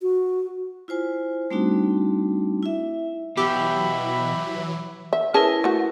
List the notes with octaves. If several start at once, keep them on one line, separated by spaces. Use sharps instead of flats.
F#4
E4 F4 C5 G#5
G3 A3 C4 D4 D#4 F#4
E4 E5
B2 E3 F#3 G4 E5 B5
E5
C#4 E4 G#4 A#4 B4 A5
A3 F#4